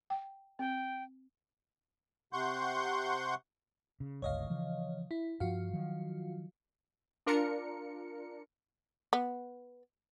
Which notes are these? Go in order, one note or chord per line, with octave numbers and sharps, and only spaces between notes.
G5
C4 G5
C3 F#5 C6 C#6 G6
C#3
G1 C#2 C#5 D#5 F5
C#3 E3 F3
E4
G2 F3 F4 F#4 F5
D#3 F3 F#3
D4 F4 A#4 C#7
B3